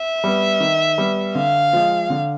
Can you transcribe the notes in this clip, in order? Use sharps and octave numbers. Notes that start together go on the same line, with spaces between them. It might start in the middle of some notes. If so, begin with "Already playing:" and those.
Already playing: E5
G3 B3
D#3
G3 B3
D3 F5
F3 G#3
D3